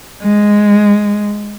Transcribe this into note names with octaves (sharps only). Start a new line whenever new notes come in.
G#3